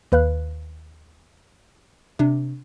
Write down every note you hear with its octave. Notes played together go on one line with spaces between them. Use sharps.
D#2 B4 F5 F#6
C3 D4